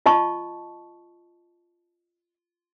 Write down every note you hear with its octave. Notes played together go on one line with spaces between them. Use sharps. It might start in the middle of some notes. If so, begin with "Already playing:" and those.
F4 D#5 A5 C#6